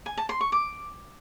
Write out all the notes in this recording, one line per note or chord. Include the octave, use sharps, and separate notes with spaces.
G#5
A5
C6
C#6
D6